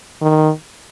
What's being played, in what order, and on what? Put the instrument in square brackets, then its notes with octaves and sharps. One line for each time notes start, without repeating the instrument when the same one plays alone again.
[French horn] D#3